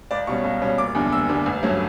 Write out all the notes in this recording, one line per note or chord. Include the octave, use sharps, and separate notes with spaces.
C#2 D5
B2 G3 C#4 C#6
C#2
B2 G3 C#4
F#1 D6
E2 D3 G3
F#1 E6
E2 D3 G3
A1
G2 F#3 A3 C#4